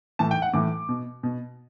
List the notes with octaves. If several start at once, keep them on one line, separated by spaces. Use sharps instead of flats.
A2 E3 A5
G5
F#5
A2 E3 D6
B2
B2